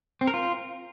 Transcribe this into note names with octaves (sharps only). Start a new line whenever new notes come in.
C4
A#4
F4